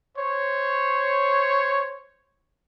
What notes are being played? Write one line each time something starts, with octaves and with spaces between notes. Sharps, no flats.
C5 C#5